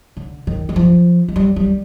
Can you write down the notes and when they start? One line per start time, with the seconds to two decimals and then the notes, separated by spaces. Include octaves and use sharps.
0.17 D3
0.47 D#3
0.69 E3
0.76 F3
1.28 G#3
1.36 G3
1.56 G3